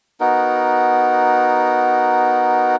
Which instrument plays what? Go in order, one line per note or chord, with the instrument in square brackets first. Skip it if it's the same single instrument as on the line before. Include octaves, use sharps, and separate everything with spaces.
[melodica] B3 D#4 F#4 A#4